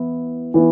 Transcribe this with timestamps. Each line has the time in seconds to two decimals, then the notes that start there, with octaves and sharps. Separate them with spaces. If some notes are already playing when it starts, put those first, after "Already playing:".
Already playing: E3 B3 E4
0.54 E3 B3 E4